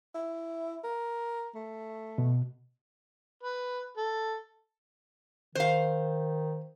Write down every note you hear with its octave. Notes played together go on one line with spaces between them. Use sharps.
E4
A#4
A3
B2
B4
A4
D#3 C5 F5